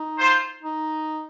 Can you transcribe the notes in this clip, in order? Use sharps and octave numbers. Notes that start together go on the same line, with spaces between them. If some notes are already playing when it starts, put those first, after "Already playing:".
Already playing: D#4
F4 A4 C5
D#4